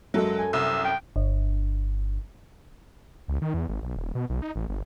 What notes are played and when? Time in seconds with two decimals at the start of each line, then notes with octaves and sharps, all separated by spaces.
0.14 F#2 F#3 G#3 A4 E5
0.39 G#5
0.53 C2 E6
0.85 G5
1.16 G1
3.28 C#2
3.41 D#3
3.54 E2
3.69 G#1
3.83 B1
3.96 D#1
4.15 B2
4.29 B1
4.42 D#4
4.55 A1
4.69 G1